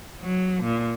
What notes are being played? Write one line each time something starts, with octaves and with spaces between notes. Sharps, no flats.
F#3
A#2